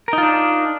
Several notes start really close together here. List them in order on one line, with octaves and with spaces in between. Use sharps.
A#4 D#4 F4 D4